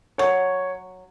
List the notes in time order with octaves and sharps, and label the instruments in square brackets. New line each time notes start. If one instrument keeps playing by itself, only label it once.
[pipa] F#3 [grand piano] C#5